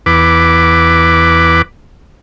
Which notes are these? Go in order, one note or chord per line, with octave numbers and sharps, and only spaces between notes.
E2 B4 D6